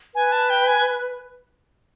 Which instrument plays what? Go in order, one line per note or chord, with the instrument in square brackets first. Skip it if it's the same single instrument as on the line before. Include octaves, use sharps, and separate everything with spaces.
[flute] B4 [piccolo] G#5
[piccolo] A5
G5
G#5